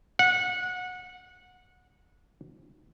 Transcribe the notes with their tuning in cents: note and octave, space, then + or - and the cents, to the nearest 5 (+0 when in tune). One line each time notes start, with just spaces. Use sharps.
F#5 -20